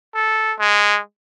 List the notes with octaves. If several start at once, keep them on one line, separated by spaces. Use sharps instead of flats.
A4
G#3